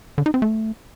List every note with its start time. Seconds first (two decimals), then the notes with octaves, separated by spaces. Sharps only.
0.18 D3
0.26 D#4
0.34 C4
0.42 A3